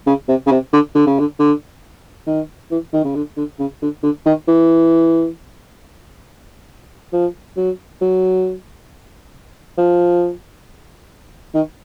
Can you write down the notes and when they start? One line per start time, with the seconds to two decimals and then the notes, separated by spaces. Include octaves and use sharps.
0.07 C#3
0.28 C3
0.47 C#3
0.51 C3
0.73 D3
0.95 D3
1.07 C#3
1.19 D3
1.39 D3
2.27 D#3
2.71 E3
2.93 D#3
3.05 C#3
3.15 D3
3.37 D3
3.59 C#3
3.82 D3
4.03 D3
4.26 D#3
4.48 E3
7.13 F3
7.57 F#3
8.01 F#3
9.78 F3
11.54 D#3